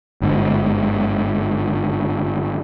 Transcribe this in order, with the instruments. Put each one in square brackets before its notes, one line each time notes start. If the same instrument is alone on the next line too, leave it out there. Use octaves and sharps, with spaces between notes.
[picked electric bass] G1 G#2 D3